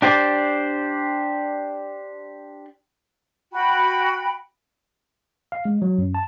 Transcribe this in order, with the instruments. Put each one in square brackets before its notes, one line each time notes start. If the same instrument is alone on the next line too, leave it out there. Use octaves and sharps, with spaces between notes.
[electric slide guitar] D4 G4 C5 D5
[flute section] F#4 G5 B5
[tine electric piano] F5
G#3
F#3
F#2
A5